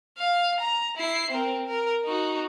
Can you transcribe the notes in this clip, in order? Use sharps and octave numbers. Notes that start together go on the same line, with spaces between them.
F5
A#5
E4 C7
C4 A#4
A#4
D#4 F#4